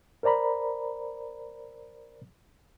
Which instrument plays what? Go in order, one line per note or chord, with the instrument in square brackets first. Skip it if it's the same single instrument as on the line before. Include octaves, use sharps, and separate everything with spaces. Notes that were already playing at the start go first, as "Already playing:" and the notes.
[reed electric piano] A#4 C5 D5 A#5 B5